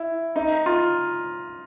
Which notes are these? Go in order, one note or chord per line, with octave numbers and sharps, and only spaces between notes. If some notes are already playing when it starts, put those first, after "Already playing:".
Already playing: E4
D#4
F4